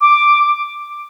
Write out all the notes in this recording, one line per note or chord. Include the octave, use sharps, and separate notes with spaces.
D6